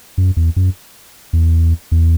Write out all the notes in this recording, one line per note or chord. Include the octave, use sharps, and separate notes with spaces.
F#2
E2
F#2
E2
E2